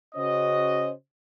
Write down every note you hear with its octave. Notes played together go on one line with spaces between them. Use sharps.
C#3 C#4 F#4 C5 D#5